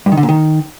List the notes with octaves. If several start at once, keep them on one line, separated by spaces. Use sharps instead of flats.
G2
D#3
D3
A#2
D#3